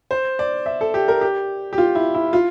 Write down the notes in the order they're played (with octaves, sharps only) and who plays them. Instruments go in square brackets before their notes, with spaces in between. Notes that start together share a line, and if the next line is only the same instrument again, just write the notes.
[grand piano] C5
D5
E5
A4
G4
A#4
G4
G4
F4
E4
E4
F4